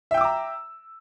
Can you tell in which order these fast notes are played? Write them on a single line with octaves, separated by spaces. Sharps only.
E5 G5 E6 D6 A#5